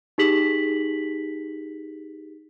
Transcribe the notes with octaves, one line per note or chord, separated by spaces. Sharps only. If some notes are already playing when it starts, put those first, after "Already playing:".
D#4 G4 G#4 B6 F#7